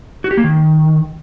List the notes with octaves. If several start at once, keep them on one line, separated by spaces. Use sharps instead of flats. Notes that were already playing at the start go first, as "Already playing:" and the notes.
F#4
G4
A#3
D#3